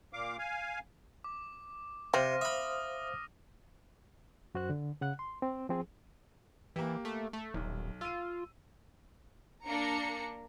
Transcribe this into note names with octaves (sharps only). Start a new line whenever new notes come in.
A#2 F5 D6
F5 G#5
D6
C3 C4 C5 F5 F6 A#6 D#7
E5 B5 D#6 F6
F#2 F#4 C5 F#6
D3
C#3 F#5 F#6
C6
C4
F3 C4 G#4
E3 A#3 G4
A3
A3
D#1 B1
F4 E6 D#7
A#3 D4 A#5 C#7